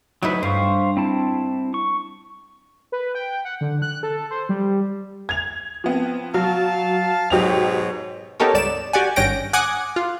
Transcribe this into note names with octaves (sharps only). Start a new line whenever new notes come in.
D2 F#3 D#4 E4 B4
G2 C5 F5 C#6
C4 E4 A5
C#6
B4
G5
F#5
D3
F#6
A4
C5
G3
G#6 F7
F3 B3 C4
F#3 F5 A5
G#2 B2 F#3 G4 C#5 F7
B3 D#4 G4 A4 A#4 C#5
C#2 G2 D5 E7
F#4 G4 D5 F#5 G#5
G#1 G2 C#4 G5 A#6 D7
F#5 G#5 D6 D#6 F#6
F4